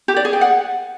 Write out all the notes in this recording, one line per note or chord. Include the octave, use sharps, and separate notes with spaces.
G4
D5
G#4
G5
F#5